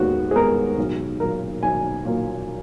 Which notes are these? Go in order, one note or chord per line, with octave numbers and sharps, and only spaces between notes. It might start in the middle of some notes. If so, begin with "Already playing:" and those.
Already playing: D#2 D#3 G#3 B3 F#4
G#4
D#3 G#3 B3 A#4
B1
A#2 F#3 A#3 A#4
B1 G#5
A#2 F#3 A#3